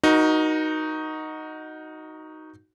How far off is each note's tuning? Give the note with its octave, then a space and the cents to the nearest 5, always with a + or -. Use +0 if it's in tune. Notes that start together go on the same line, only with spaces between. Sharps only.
D#4 +0 F#4 +0 A#4 +35